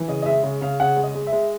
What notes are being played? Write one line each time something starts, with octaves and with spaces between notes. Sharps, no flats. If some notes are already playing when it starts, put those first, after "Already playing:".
Already playing: E3
C#3 D#5
D#5
G#3 E5
C#3
C#3 F5
C#3 F#5
G#3
D#5
G#3
E5
G#3